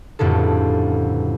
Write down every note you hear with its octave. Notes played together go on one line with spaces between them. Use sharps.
G1 F2 A2 C#3 A4